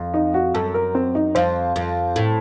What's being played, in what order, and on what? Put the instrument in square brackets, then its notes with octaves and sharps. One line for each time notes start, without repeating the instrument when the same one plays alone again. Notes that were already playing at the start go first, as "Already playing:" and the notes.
Already playing: [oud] F2
[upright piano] D#4
F#4
[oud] F#2 [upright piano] A4
[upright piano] A#4
C4
D#4
[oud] F2 [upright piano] C5
[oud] F2
A2